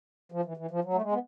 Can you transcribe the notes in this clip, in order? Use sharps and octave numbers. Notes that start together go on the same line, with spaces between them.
F3
E3
E3
F3
F#3
A3
G#3
B3